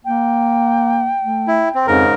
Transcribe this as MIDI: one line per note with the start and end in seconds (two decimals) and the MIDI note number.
0.05 1.12 58
0.05 1.88 79
1.22 1.66 57
1.47 1.69 64
1.75 1.87 60
1.87 2.05 41
1.87 2.14 44
1.87 2.14 49
1.87 2.14 70